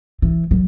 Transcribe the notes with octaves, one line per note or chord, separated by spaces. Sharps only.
E3
F#3